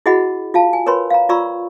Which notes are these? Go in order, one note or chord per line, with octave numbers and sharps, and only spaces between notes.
E4 F#4 G#4 D#5 F#5 B5
F4 F5 A5
G#5
A#4 B4 C#5 B5 C6
F5 A#5
F4 D5 A#5 B5 C#6 E6